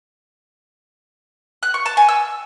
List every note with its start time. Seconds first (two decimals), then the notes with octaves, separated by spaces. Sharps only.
1.63 F#6
1.74 C#6
1.86 A5
1.97 G#5
2.08 E6